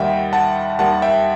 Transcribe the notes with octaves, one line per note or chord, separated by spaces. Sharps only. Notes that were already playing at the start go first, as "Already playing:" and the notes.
Already playing: D#2 D#3 G3 D#5 E5 F#5 G5
F#5 A5
D#2 D#3 G3 F#5 A5
E5 G5